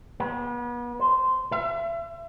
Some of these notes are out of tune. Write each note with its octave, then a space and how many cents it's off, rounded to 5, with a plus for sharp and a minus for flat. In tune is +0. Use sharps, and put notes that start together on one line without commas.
B3 -35
C5 -10
E5 +35